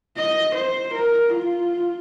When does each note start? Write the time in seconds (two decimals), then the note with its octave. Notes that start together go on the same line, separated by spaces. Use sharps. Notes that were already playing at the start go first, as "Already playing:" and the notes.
0.17 D#5
0.55 C5
0.95 A#4
1.34 F4